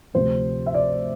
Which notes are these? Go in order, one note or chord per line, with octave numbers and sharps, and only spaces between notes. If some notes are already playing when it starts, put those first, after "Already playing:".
D2 C3 F3 C4 C5
E5
D5